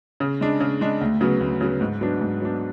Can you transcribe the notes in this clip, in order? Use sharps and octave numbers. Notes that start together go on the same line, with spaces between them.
C#3
G#3 D4
C#3
G#3 D4
D2
C#3 F#3 B3
D2
C#3 F#3 B3
G#2
F#3 B3 D4
G#2
F#3 B3 D4